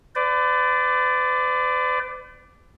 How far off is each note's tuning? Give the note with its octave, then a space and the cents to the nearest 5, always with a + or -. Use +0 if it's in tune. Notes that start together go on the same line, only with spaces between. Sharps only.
B4 +45 D5 +0